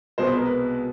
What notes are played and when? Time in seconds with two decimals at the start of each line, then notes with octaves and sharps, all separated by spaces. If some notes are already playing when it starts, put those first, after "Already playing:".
0.18 C2 B2 G#3 B3 C5
0.27 B4
0.37 A#4
0.46 B4